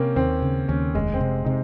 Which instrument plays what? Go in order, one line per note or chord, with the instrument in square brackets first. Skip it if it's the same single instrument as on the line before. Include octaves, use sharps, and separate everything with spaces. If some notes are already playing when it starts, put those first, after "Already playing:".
Already playing: [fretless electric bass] C3 [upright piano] A#3 C4 C#4
[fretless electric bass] D#2 [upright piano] C4
[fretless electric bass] C#3
[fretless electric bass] D#2 [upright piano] C#4
[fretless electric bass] F1 [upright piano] G#3
[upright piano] C4
[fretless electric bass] C3
[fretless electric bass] C3 [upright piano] D#4